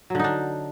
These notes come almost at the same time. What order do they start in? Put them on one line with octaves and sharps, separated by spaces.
F#3 D3 D#4 D4